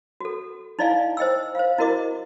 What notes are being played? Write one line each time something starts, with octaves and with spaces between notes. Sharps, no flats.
F#4 A4
D#4 E4 D5 D#5 F5 G#5
C5 D#5 G5 E6
C5 F5
E4 F#4 A#4 D#5 D6